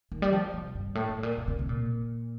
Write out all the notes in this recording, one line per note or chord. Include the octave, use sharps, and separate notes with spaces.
D#3
G3
F3
C3
G2
A2
A2
A#2
A#2
C3
C3
A#2